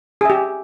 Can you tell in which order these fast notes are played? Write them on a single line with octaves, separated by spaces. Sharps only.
G#4 E5 G4